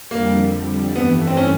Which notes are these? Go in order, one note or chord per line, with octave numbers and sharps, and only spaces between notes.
F2 D3 G3 A#3
G2 E3 A3 B3
C4
C#4